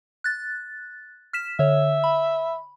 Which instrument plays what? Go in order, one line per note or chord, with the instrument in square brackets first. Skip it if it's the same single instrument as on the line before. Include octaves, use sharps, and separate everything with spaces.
[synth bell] F#6 A6
F6 B6 E7
[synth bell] D3 C#5 [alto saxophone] E5
[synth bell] B5